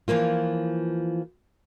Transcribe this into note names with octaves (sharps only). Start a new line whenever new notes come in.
E3 F3 A#3 F4